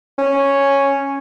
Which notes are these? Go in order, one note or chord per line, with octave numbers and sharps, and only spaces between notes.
C#4